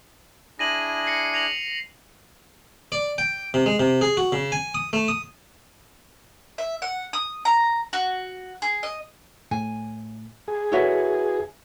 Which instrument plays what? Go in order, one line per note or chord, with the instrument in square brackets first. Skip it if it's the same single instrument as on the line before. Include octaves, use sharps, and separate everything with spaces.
[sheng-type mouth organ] D4 E4 G#4 [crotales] A#6 D#7 F#7
[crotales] A#6 C7 C#7
A#6 F7 F#7
[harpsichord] D5
G5
C3
G#3
C3
G#4
F#4
C#3
G#5
D#6
A3
D#6
[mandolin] E5
F#5
D#6
A#5
F#4
G#4
D#5
[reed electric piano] A2 [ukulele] G#5
[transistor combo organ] G#4
[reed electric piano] E4 F#4 B4 [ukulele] A4 C#5 E5